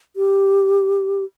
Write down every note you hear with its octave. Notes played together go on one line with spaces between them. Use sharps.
G4